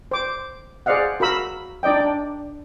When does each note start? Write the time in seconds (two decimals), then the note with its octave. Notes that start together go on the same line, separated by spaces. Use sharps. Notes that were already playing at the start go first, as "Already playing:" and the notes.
0.11 C5 D6
0.86 G#4 C5 D5 D#5 F5 F#5
1.20 F#4 A#4 F5 B5 E6
1.83 D4 D#4 D5 D#5 G5
2.00 D4